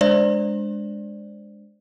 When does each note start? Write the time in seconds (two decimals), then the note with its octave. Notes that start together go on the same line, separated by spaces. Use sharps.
0.01 G#3 D4 C5 D5